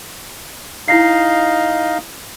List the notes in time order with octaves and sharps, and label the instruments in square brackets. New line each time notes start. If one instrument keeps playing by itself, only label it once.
[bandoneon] D#4 D#5 F5 [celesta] E4 A#6 C7